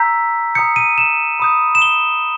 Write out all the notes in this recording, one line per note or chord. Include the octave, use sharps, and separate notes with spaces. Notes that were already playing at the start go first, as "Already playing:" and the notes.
Already playing: A#5 E6 G6 B6
A#5 D#6 G6 C#7
D#7
E7
B5 D#6 G6
E7
G7